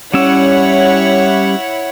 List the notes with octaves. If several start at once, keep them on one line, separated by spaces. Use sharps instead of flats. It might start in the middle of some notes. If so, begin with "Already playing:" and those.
G3 C#4 E4 C#5 F#5 E6